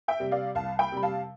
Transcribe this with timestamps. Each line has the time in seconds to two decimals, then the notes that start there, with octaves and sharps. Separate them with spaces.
0.08 E5 G5
0.20 C3 G3
0.31 D5 F5
0.55 C2 F5 A5
0.79 G5 B5
0.92 C3 G3 B5
1.03 F5 A5